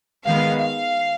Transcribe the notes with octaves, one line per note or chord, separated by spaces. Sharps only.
D#3 G#3 B3 F5
F5